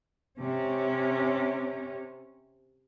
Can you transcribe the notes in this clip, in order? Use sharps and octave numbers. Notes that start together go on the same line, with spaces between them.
C3 C#4